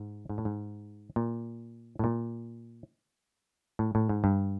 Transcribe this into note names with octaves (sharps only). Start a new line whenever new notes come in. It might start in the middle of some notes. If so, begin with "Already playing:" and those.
Already playing: G#2
G#2
A2
G#2
A#2
A2
A#2
A2
A2
G#2
G2